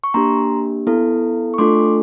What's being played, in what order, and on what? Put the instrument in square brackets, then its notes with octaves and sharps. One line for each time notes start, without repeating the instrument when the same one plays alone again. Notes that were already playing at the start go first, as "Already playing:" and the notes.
[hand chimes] C#6
A#3 D4 G4 A#5 C6
B3 E4 A4
C#6
A3 D4 F4 A4 C6 D6